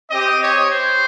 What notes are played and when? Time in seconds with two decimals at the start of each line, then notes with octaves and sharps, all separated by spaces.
0.11 C4 G4 D#5
0.41 C#5
0.71 C5